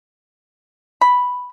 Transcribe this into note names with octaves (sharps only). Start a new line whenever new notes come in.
B5